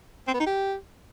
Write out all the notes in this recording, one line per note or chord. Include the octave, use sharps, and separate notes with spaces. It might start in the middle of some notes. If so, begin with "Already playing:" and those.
C4
B3
D#4
G4